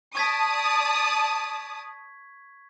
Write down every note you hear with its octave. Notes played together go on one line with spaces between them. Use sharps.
D5 A5 C#6 D#6 G#6 B6